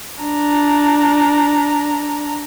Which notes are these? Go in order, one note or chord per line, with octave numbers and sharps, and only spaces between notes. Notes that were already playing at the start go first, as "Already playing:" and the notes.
D4 A#5